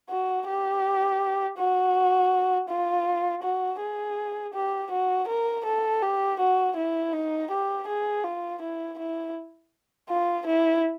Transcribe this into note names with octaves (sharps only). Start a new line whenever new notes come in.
F#4
G4
F#4
F4
F#4
G#4
G4
F#4
A#4
A4
G4
F#4
E4
D#4
G4
G#4
F4
E4
E4
F4
E4